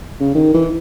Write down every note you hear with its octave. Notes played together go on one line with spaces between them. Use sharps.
C#3
D#3
E3